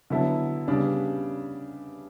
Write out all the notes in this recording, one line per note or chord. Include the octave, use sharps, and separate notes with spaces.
D3 F#3 B3 E4 A4
C#3 G3 B3 D4